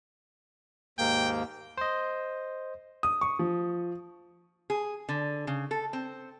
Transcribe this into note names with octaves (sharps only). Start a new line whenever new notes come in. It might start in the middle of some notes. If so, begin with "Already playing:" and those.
D#2 G#2 A#3 G5
C5 D#5
D#6
C#6
F3
G#4
D3
C#3
A4
C4